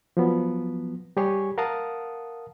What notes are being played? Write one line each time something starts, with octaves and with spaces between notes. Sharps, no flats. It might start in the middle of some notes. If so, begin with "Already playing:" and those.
F3 F#3 B3
G3 G4 G#4 C#5 G#5 C#6
A#4 F5 F#5 A5 D#6